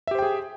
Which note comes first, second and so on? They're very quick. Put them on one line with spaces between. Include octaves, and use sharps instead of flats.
E5 G4 C5 G5 G#4